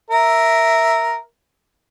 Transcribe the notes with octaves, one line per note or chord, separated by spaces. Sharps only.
A#4 E5